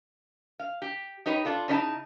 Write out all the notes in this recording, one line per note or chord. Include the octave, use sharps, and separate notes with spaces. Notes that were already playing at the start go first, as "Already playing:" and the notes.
F5
G4
D#4 G4 B4 C#5
D4 F4 A4
C#3 C#4 D#4 E4 A5